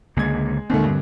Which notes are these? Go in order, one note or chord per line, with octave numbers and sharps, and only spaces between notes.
C#2 D3 G#3 A#3 G#6
D#2 G#2 D3 A3 C4
G2